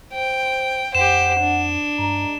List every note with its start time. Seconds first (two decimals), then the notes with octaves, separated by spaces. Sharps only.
0.13 C5 G5
0.95 F2 G4 C5 F#5 E7
1.40 D4
1.99 G2 G#3 A#5